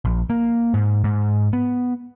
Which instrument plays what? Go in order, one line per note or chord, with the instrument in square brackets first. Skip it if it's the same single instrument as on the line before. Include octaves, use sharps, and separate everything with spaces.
[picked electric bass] A#1
A#3
G#2
G#2
B3